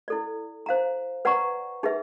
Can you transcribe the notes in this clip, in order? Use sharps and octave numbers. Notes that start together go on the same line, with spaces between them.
E4 A4 D5
C5 F5 A#5
B4 D5 F#5 A#5 C#6
D#4 G#4 B4 E5